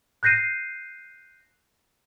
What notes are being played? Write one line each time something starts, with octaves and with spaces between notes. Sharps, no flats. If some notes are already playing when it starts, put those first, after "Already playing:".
F#6 G6 A#6 C7 D#7